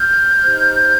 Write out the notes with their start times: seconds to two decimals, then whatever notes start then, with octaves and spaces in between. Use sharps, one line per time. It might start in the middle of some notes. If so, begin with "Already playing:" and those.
Already playing: F6 G6
0.44 D#4 G4 C5